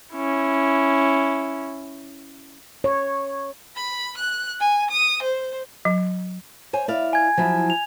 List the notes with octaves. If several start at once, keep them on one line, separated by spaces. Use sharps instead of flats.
C#4 E4
C#5
B5
F#6
G#5
D#6
C5
F#3
C5 C#5 G#5
E4 D5 F5
G#5 G#6
F3 F#3 E4
F7